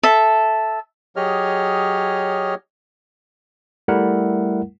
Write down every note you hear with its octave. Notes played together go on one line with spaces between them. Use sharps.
A4 E5
F#3 G4 G#4 C#5 D#5 F6
G3 A3 E4 A#4 F#5